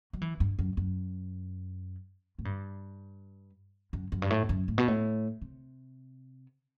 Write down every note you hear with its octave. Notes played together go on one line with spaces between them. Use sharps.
F#3
E3
G2
F#2
F#2
A2
G2
F#2
F#2
G2
A2
F#2
A2
B2
A2
C3